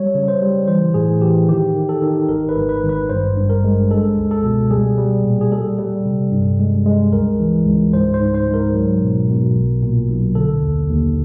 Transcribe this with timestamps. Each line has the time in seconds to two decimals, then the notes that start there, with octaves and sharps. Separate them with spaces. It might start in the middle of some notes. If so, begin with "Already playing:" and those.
Already playing: G3 C#5
0.15 C#3
0.28 C5
0.41 G3
0.67 E3 C5
0.94 A2 G#4
1.21 E3 G4
1.49 D#3 G4
1.75 D#3
1.89 A4
2.02 D#3
2.29 G#1 A#4
2.49 B4
2.56 G#1
2.69 B4
2.83 G#1
2.89 B4
3.10 G2 C5
3.37 G2
3.50 A#4
3.64 G#3
3.90 G#3 A4
4.18 C#2
4.31 A4
4.44 B2
4.71 G3 G#4
4.98 G3
5.24 A#2
5.41 G#4
5.52 G3 A4
5.79 G3
6.05 C3
6.32 G2
6.60 G#3
6.86 G#3
7.13 C#2 A#4
7.40 E3
7.67 C#2
7.93 G#2 C5
8.14 C5
8.20 G#2
8.34 C5
8.48 G#2
8.54 A#4
8.74 F#3
9.01 B2
9.28 B2
9.55 B1
9.83 A#2
10.09 B1
10.35 D3 A4
10.62 D#2
10.89 D#2